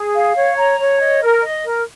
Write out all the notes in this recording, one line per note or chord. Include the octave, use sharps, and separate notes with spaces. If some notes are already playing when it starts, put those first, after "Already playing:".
Already playing: G#4
F5
C#5
A#5
C#5
D#5
A#4
D#5
A#4